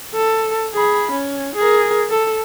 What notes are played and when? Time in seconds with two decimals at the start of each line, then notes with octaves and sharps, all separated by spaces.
0.14 A4
0.74 G#4 B5
1.11 C#4
1.55 G#4 A#4
2.10 A4